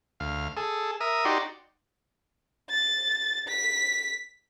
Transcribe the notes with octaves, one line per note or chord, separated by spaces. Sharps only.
D2 F5
G#4 A4
A#4 E5 D#6
D#4 F#4 G4 D5 C6
A6
B6